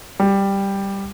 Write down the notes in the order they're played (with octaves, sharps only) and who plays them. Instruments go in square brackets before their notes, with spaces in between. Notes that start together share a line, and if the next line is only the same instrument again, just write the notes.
[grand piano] G3